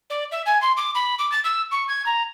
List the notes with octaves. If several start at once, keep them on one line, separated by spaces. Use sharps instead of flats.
D5
E5
G#5
C6
D6
B5
D6
A6
E6
C#6
G#6
A#5